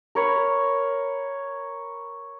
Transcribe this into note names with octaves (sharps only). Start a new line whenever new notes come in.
A#4 C#5 B5